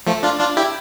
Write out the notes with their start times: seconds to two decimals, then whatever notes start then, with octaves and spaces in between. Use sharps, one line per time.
0.07 F3 A3
0.23 D4 F4
0.40 D4 F4
0.57 E4 G4